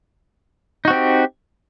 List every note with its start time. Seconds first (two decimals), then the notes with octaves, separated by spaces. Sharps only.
0.85 D#4
0.88 F#4
0.90 C4
0.93 G4